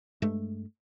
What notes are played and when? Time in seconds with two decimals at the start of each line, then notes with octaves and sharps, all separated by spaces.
0.22 G2 G#3 A3